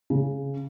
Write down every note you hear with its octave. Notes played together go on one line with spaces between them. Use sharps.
C#3